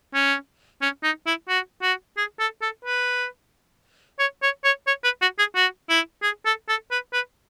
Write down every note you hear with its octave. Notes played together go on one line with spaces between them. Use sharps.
C#4
C#4
D#4
E4
F#4
F#4
G#4
A4
A4
B4
C#5
C#5
C#5
C#5
B4
F#4
G#4
F#4
E4
G#4
A4
A4
B4
B4